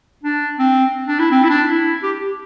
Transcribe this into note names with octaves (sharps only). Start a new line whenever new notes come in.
D4
C4
D4
E4
C4
E4
D4
E4
G4